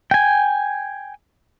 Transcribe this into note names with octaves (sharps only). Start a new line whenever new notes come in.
G5 G#5